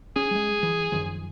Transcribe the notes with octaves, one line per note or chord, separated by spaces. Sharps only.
C#4 G#4
G3 G#3
E3
F#2 D#3 F3